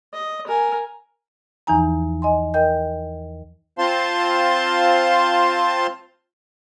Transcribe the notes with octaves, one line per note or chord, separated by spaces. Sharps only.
D#5
A#4 G#5
E2 E3 F3 D#4 G#5 A#5
D#5 G#5 C6
A#4 D#5 G5 G6
C4 F4 C5 F5 A5 C6